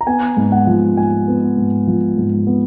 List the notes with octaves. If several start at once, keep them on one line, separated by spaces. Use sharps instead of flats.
A#5
B3 G#5
G#2
F#5
F3
G#2 G#5
B3
G#2
F3
G#2
B3